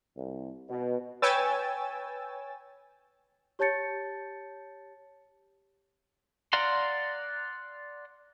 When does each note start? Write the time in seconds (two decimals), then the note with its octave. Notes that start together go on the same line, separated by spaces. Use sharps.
0.16 C2
0.69 B2
1.22 B4 C#5 G5 G#5 E6 A6
3.59 G4 C#5 A5 G6 A6 C#7
6.53 D5 F5 F#5 A#5 C6